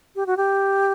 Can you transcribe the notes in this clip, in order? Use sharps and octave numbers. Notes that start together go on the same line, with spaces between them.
G4
F#4
G4